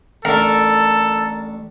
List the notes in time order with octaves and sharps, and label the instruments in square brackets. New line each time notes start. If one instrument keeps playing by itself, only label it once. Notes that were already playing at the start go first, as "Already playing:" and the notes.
[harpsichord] A1 D4 [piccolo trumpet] A4 [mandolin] A#4